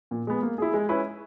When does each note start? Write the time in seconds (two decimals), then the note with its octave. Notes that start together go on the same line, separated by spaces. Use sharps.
0.11 A#2
0.27 G#3 B3
0.43 A#3
0.58 E4 G#4
0.74 G#3
0.89 C#4 E4 B4